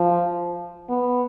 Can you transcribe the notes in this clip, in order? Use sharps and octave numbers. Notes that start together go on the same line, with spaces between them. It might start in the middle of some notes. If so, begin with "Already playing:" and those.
Already playing: F3
B3